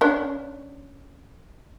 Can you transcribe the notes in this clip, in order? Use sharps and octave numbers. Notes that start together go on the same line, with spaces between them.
C#4 D4